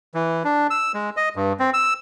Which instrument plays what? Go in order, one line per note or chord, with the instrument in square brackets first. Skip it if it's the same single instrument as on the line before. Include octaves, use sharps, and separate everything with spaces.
[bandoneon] E3
D4
E6
G#3
D#5
G2
C4
E6